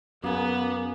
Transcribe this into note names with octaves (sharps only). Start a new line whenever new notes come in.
F#2 A#3 B3 G#4 F#5